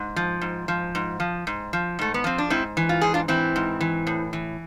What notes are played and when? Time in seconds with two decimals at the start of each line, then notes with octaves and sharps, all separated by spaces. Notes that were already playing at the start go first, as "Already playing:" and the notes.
Already playing: G#2
0.16 F3
0.41 G#2
0.68 F3
0.95 G#2
1.20 F3
1.47 G#2
1.73 F3
1.99 G#2 A3
2.14 B3
2.24 F3 C4
2.38 D4
2.50 G#2 C4 E4
2.77 E3
2.89 F4
3.01 G#2 G#4
3.14 D4 F4
3.28 E3 C4 E4
3.56 G#2
3.81 E3
4.07 A2
4.33 E3